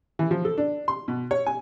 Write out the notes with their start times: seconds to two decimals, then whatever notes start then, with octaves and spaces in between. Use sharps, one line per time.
0.19 E3
0.31 F3
0.45 A4
0.58 D4
0.88 C6
1.08 B2
1.31 C#5
1.46 G#5